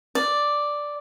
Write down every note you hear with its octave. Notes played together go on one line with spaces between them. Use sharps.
D5